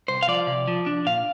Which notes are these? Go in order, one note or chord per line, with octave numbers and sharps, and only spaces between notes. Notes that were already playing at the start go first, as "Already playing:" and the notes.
C2 C5
F5
F3 D5
C3
F3
D4
A#2 F5